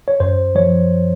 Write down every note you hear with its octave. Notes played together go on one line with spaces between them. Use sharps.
C#5
F#2 C5
F3 C#5